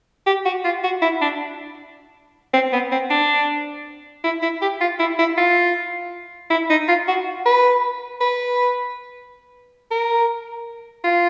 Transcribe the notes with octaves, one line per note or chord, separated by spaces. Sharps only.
G4
F#4
F4
F#4
E4
D4
C4
B3
C4
D4
E4
E4
G4
F4
E4
E4
F4
E4
D#4
F4
F#4
B4
B4
A#4
F4